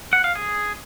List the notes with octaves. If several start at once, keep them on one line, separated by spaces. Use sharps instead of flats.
F#5
F5
G#4